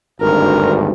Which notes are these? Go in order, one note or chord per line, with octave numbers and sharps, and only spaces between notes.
G#1 D2 G2 A#4